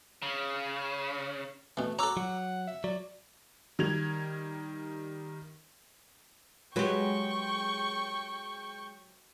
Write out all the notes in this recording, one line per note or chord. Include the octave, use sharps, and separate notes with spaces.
C#3
B2 E3 A3
F#4 A4 C#5 A#5 D6 E6
F#3 F#5
E5
F#3 D5
D#3 G3 G#6 F7
F#3 G#3 G4 B4 G5 C#6